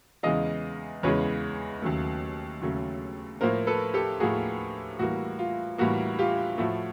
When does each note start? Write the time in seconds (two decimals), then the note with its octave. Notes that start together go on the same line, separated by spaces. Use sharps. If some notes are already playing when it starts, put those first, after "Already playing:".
0.23 E2 C#3 E3 G#3 D#5 F5
1.03 E2 C#3 E3 G#3 B4 C#5
1.82 D#2 C#3 F#3 A3
2.61 D#2 C#3 F#3 A3
3.41 A2 F3 A#3 A#4 C5
3.67 A4 B4
3.94 G4 A4
4.20 A2 F3 A#3 F#4 G#4
4.99 A2 E3 G3 A#3 F#4
5.39 F4
5.78 A2 E3 G3 A#3 F#4
6.19 F4 G4
6.58 A2 F3 A3 F#4